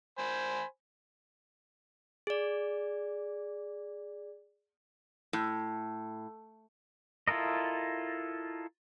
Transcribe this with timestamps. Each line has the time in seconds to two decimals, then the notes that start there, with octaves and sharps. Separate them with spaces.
0.18 C5 G#5 B5
2.27 G#4 D5
5.33 A2
7.28 E4 F4 A4 A#4 D#5